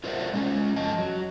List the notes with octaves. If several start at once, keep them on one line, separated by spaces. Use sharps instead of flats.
F4 A#4 C5 D5 E5 F#5
G#3 C#4 F4
F2 D#5 A5
F#3